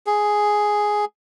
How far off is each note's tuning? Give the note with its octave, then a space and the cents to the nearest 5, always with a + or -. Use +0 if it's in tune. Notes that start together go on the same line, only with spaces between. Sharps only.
G#4 +5